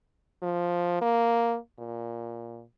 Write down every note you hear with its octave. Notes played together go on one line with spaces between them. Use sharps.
F3
A#3
A#2